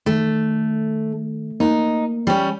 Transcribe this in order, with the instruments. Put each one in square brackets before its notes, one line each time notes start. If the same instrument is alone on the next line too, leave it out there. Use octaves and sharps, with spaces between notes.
[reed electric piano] D#3 [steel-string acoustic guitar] A3
[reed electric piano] A#3 [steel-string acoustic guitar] D#4
[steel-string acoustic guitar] G3 C#4